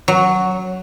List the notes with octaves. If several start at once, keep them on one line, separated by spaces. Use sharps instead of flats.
F#3